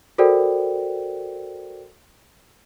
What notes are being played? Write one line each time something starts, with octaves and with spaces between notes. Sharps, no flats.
F#4 A4 A#4 C5 D5 G5